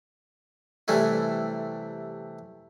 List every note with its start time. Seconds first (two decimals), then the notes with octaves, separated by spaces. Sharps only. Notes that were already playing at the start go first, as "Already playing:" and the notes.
0.88 C3 E3 G3 A3 E4